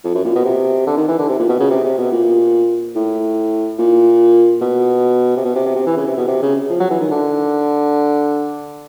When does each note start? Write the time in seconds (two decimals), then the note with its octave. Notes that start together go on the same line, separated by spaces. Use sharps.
0.04 F2
0.15 F#2
0.25 A#2
0.35 B2
0.45 C3
0.87 D3
0.97 D#3
1.08 E3
1.18 D3
1.29 C3
1.39 A#2
1.49 B2
1.60 C#3
1.70 C3
1.84 C3
1.98 B2
2.12 A#2
2.96 A2
3.79 A#2
4.61 B2
5.37 C3
5.45 B2
5.55 C3
5.66 C3
5.76 C3
5.86 E3
5.97 C#3
6.07 C3
6.17 B2
6.28 C3
6.42 C#3
6.70 F3
6.80 F#3
6.90 E3
7.00 D#3
7.11 D3